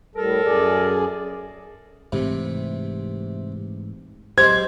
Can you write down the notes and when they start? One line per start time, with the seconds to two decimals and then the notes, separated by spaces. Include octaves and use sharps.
0.16 A2 G3 A4 A#4
0.45 F#2 G#4 D5
2.12 G#2 C3 E3 A3
4.38 F#3 G#3 G4 C5 G#6